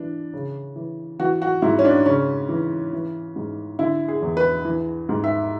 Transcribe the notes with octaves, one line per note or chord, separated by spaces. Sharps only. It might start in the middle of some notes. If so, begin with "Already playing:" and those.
Already playing: E3 D4
C#3
E3
E3 F#4
F#4
G#2 E4
C#4
D4
C#3 C#4
E3
E3
G#2
D3 E4
G#4
E2
B4
E3
G#2
E5